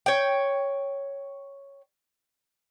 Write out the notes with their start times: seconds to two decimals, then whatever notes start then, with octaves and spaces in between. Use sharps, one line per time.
0.06 C#5 G5